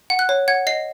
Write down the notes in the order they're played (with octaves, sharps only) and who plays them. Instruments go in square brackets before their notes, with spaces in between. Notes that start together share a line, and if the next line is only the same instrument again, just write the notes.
[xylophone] F#5
F#6
C#5
F#5 G#6
D#5 C7